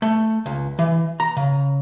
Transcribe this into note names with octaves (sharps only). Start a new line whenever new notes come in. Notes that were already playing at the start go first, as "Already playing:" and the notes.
A3
C#2
E3
A#5
C#3